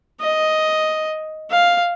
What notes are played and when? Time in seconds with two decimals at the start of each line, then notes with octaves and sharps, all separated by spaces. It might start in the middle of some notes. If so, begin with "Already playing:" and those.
0.21 D#5
1.51 F5